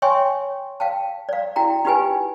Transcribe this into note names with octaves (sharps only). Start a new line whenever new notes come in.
C#5 E5 G5 G#5 C6 C#6
F5 G5 A5
D5 F5
E4 F#4 G5 A#5
D#4 F4 G4 B4 G5 G#5